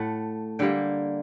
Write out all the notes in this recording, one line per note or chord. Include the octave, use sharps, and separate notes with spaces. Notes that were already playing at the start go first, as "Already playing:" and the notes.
Already playing: A2 A3 F#5
D3 G3 A#3 G5